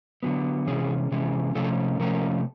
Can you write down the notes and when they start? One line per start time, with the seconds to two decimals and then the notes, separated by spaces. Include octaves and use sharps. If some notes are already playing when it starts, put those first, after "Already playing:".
0.23 D3 F#3 B3
0.67 C3 E3 G#3 C#4 G#4
1.12 C3 E3 G#3 C#4
1.55 C3 F3 A3 C#4 A4
1.99 C3 F3 A3 C#4 A#4